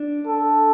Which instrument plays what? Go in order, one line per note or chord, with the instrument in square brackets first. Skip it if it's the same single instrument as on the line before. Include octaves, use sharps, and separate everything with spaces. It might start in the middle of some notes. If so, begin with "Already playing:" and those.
Already playing: [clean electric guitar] D4
[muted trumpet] A4